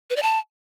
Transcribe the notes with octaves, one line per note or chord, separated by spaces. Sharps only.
B4
D5
A5